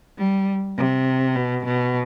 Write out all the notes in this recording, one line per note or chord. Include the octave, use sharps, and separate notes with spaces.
G3
C3
B2
B2